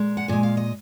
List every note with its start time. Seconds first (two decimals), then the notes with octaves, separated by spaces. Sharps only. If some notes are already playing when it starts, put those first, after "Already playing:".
Already playing: A#2 G#3
0.17 F#5
0.28 A#2 G#3 G#5
0.43 F5
0.57 D#5